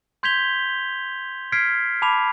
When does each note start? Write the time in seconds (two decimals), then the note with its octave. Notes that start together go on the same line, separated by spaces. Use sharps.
0.23 C6 G6 G#6 B6 F7 G7
1.52 F6 G#6 B6 C7 D7
2.02 A5 B5 D6 F7